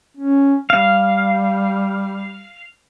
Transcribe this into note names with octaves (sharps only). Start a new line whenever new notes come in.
C#4
G3 F5